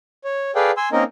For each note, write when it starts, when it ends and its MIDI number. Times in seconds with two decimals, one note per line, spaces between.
0.24 0.51 73
0.55 0.71 68
0.55 0.71 69
0.55 0.71 71
0.55 0.71 74
0.55 0.71 77
0.55 0.71 79
0.77 0.89 80
0.77 0.89 84
0.77 0.89 88
0.92 1.04 58
0.92 1.04 60
0.92 1.04 61
0.92 1.04 63
0.92 1.04 70
0.92 1.04 75